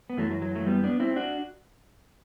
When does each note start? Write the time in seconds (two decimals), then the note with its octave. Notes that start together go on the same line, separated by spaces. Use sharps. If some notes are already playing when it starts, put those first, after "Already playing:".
0.10 B3
0.17 F#2 E3 F#3 A3
0.31 F#3
0.42 F#3
0.55 F#3 A3
0.66 G3 B3
0.84 B3 D4
1.00 C4 E4
1.16 D4 F#4